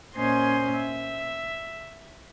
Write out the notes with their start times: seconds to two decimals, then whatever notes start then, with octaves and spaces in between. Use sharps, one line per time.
0.15 A#2 C#4 C5 D#5 G#5 C6
0.73 E5